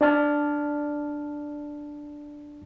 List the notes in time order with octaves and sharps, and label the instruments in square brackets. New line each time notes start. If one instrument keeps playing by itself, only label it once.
[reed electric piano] D4 D5 A5 F6